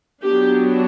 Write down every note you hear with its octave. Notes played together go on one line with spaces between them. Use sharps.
F#3 B3 D4 G4